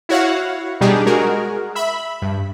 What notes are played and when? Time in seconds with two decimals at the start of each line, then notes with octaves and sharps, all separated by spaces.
0.09 E4 F#4 C#5 F5 F#5
0.81 B2 G3 D4 D#4 G4 G#4
1.06 G#3 F#4 G#4 A#4
1.75 E5 B5
2.22 G2